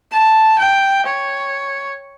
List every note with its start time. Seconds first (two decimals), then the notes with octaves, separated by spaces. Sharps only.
0.12 A5
0.59 G5
1.07 C#5